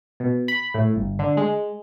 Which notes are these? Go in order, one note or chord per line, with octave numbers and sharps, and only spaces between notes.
B2
B5
A2
G1
D3
G#3